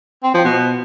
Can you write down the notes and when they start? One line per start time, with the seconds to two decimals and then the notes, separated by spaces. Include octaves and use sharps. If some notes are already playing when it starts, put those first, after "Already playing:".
0.24 C4
0.34 F3
0.45 B2